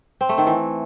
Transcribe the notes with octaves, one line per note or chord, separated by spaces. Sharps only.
C4
A3
D#3
E3